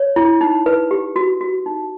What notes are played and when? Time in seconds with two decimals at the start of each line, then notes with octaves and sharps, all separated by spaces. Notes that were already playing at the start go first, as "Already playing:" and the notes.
Already playing: C#5
0.16 E4
0.41 D#4
0.66 B4
0.91 G4
1.16 F#4
1.41 F#4
1.66 D#4